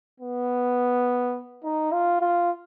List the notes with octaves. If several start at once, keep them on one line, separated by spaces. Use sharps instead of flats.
B3
D#4
F4
F4